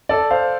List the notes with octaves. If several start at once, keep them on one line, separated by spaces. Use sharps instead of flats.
A4 D5
C5 F5